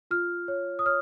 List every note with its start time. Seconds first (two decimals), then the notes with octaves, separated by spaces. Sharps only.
0.11 F4 F6
0.48 C#5
0.79 D#6
0.86 C#5 F6